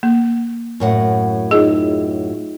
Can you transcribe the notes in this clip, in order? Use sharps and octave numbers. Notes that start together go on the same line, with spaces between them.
A#3
F#2 A2 F#5
D#4 F4 G#4 D#5